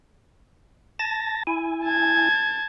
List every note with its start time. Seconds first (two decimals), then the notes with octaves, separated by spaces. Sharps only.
0.99 A5 A6 A#6
1.47 E4 G#5
1.85 A5 G#6